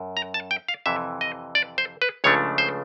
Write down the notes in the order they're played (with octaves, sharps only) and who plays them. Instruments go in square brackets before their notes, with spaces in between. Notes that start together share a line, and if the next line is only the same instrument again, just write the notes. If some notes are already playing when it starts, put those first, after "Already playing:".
Already playing: [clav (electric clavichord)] F#2
A#5
A5
G5
F5
F2 C3 E3 E5
D#5
D5
C5
B4
C#2 C#3 F3 A3 D4 C#5
C5